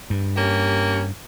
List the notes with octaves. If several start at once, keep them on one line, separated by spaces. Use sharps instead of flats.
G2
A#3 C#4 G4